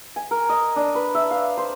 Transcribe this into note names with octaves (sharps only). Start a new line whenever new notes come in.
G#5
A#4
D#5
D4
B4
E5
F5
C5